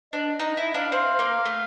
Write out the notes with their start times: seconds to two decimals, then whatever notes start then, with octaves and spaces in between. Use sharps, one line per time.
0.13 D4 D#5
0.39 D#4 D#5
0.57 E4 E5
0.74 D4 F5
0.92 C4 F5
1.19 A#3
1.46 A3